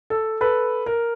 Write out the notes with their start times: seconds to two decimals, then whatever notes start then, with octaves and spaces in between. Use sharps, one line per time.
0.10 A4
0.41 A4 B4
0.86 A#4